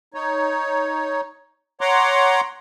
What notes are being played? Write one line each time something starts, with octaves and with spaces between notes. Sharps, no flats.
D#4 C#5
C#5 F#5 A#5 C6 D6